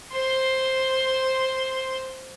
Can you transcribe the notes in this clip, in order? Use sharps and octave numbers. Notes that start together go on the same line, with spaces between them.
C5 C6